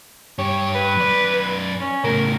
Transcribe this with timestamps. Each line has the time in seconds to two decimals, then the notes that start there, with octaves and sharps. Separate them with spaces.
0.39 G2 G4 C#5
0.75 B4
0.97 F#2 D5
1.81 C#4
2.04 A2 C#3 A#4